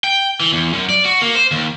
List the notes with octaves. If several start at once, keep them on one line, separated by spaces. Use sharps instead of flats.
G5
E3
E2
F#2
D5
F#4
A#3
C5
D#2